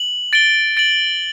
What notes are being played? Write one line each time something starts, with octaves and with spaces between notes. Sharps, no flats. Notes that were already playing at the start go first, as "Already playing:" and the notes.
Already playing: F#7
A6 D7 G7
A6 D7 F#7